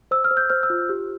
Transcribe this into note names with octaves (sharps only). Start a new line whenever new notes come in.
C5 E6
F6
C5
G6
C5 F6
E6
F4
G4